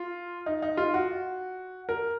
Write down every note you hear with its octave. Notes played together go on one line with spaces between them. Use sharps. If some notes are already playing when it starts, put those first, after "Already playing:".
Already playing: F4
D#4
D#4
F4
F#4
A#4